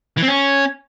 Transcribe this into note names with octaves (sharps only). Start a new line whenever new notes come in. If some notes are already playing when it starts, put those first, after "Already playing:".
E3
C4
C#4